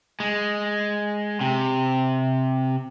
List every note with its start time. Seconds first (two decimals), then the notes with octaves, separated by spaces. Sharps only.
0.20 G#3
1.41 C3